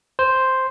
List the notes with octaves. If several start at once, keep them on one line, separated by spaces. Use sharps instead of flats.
C5